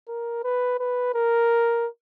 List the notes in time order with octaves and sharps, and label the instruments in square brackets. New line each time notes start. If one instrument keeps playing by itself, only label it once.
[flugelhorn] A#4
B4
B4
A#4